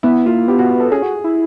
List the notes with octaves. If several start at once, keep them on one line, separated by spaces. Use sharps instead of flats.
B3 E4
A#3 F4
B3 G4
F#4
A4
C#4 G#4
F#4
E4